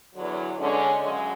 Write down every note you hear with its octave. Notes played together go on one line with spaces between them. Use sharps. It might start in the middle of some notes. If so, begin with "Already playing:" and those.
E2 D3 F#3
D3 G#3 C#4
F#2 C#3 G#3